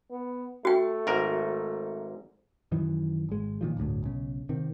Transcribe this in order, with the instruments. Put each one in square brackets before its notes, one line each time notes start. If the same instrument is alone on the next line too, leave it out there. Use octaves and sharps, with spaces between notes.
[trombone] B3
[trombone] A3 [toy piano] F#4 G5
[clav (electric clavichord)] G#1 G#2 A#4
[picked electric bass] F#2 D#3 E3
G#1 G#3
A#2 D#3 F3
D1 G1 D2 A2
B1 C#3
C3 D#3